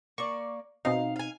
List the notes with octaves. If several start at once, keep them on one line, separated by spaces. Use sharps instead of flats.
A#3 D5 C#6
B2 C4 D#4 F5
F5 G#5